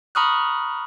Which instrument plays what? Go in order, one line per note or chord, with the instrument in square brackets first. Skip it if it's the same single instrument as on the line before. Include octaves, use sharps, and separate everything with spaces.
[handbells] A#5 B5 C#6 D#6 F6 F#6